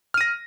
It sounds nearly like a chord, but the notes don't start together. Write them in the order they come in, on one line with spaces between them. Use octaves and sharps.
F6 D#7 A#6